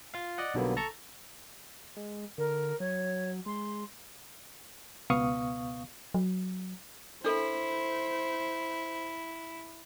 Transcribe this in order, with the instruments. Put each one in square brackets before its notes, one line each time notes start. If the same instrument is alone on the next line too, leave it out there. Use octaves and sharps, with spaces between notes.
[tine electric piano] F4 F5
D5 D#5 F#5
B1 D3 F#3 G3 A#3 B3
A4 A5 A#5 C#6
[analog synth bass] G#3
[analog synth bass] D3 [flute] A#4
[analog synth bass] F#3 [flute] C#5
[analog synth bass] G#3 [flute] C6
[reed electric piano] C#2 B2 B3 F5 C#6 D#6
[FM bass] F#3
[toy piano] D4 A4 [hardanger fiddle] E4 [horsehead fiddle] C5